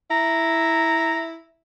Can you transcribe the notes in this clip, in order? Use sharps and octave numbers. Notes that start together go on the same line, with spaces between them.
E4 A#5